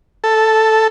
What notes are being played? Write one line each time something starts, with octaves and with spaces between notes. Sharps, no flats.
A4